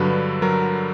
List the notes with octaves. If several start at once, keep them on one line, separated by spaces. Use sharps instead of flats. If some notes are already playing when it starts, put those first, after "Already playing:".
Already playing: G2 D3 F#3 B4
F#3 A#4